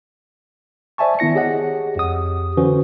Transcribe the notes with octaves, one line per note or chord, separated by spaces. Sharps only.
C5 D5 E5 G#5 A5 C#6
D#3 B3 E4 A#6 C#7
G4 G#4 C#5 D#5 F#5
F2 G4 D#6
D3 E3 C#4 F#4 B4 C5